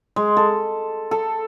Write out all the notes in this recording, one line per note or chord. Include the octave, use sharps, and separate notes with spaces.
G#3
A4
A4